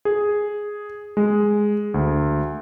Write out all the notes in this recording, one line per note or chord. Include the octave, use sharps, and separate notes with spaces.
G#4
G#3
D2